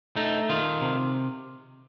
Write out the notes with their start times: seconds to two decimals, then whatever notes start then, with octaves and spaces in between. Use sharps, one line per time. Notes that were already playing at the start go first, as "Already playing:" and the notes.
0.16 A3 D#4
0.49 D#3 F4
0.81 C3